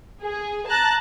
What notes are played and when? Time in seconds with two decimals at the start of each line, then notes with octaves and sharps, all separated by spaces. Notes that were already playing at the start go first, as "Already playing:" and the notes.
0.22 G#4
0.68 A5 A#5 F#6 A6